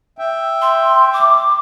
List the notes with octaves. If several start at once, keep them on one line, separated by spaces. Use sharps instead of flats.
E5 G5
C6
D6